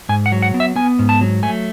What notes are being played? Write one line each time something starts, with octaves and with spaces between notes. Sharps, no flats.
G#2 G#5
F#5
F#3
F#5
B3
E5
B3 G#5
G#2
A5
F#3
A3 G#5